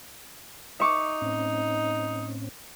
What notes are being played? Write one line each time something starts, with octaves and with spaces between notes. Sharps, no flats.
D#4 E5 C#6 D6
A2 C4 C#4